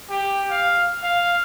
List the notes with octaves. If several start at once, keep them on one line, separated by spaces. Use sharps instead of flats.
G4
F5
F5